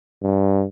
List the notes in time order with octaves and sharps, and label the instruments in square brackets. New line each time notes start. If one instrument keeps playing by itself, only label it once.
[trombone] G2